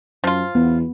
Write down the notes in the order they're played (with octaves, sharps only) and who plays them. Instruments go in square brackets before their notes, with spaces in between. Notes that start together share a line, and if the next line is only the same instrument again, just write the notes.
[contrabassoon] F#2 [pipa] F3 F4
[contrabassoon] E2 [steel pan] B3